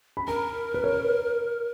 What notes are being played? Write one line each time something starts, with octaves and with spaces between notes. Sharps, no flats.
B5
A#4 A#5
B4
C#5
B4